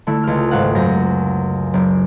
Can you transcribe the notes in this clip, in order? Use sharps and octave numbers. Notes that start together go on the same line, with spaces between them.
D3 A3 E4
C#2 F6
G#1 F5 F#5
F#2 A#6
F#1